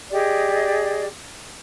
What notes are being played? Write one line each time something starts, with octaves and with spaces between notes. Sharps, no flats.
G4 G#4 D5 D#5